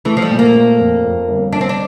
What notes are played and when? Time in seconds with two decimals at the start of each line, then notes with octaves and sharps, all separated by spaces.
0.05 E3 A3
0.17 F3
0.22 G3
0.30 A#2
0.39 A#3
0.54 A3
0.79 F2
1.04 F2
1.28 G1
1.53 G1 D4
1.61 C4
1.69 D4